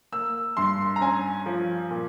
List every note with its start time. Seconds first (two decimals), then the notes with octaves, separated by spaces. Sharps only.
0.12 A#3 E6
0.57 G2 C6
0.96 A#5
1.01 C#4 G#5
1.46 F3
1.90 A#2